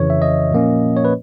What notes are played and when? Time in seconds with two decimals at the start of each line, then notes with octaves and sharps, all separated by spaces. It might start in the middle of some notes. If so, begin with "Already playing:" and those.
Already playing: F2 C#3 E3 C#5
0.10 E5
0.22 D#5
0.51 A#2 F3 A#3 C#4
0.97 C#5
1.05 B4